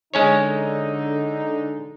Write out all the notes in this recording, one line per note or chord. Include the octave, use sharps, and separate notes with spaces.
D3 G#3 C#4 D#4 C#5